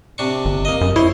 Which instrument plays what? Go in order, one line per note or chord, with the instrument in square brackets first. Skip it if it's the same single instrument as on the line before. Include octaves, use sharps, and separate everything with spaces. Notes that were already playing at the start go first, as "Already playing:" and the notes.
[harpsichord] C3 D4 C#6
[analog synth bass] G1
[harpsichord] A#3 D#5
[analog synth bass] F#2
[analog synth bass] E4 [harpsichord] C5 C#5